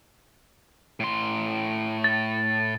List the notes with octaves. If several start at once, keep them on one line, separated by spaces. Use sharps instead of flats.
A2 C6
A6